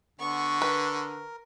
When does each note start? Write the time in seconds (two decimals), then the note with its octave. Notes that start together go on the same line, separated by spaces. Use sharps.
0.20 D3 B3 C#6
0.62 A#4 B4